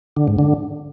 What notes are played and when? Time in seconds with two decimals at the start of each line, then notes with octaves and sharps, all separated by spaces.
0.17 D3
0.28 G#2
0.39 D3